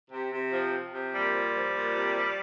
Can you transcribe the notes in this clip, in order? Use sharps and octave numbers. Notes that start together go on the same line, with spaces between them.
C3
C3
F3
F3
C3
A#2 G3
F3
F3
A#2
C3
F3